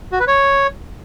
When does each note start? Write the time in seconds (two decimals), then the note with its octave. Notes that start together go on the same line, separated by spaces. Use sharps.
0.12 F#4
0.20 B4
0.27 C#5